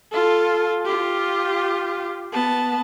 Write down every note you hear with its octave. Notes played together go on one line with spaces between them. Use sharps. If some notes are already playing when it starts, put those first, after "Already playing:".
F4 A4
F4 G4
B3 A5